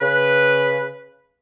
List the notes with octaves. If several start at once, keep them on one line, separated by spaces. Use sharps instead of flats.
C#3 B4